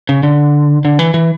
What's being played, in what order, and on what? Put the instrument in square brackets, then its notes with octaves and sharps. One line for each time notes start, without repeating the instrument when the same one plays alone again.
[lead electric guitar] C#3
D3
D3
E3
E3